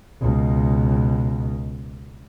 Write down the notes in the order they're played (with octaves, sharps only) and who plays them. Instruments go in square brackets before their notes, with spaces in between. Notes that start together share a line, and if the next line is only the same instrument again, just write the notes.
[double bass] C#2 B2